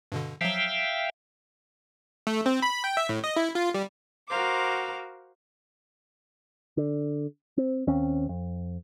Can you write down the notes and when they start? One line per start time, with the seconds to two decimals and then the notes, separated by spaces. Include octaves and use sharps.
0.12 G2 B2 D3
0.41 F3 F#3 E5 F5 G5
2.27 A3
2.46 C4
2.62 B5
2.84 G5
2.97 E5
3.09 A2
3.24 D#5
3.36 E4
3.55 F4
3.74 G3
4.28 F#4 A#4 C5 F5 D6
6.77 D3
7.57 C4
7.87 D#2 C4 C#4
8.29 F2